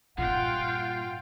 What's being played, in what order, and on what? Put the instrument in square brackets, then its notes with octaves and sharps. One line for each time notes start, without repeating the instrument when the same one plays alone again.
[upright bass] G2 A#2 [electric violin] F4 G5 [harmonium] F#5